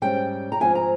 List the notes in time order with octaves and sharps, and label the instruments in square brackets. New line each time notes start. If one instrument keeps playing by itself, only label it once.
[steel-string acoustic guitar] G#2 G3 C#4 G5
A#5
G#2 F3 C4 G#5
A#5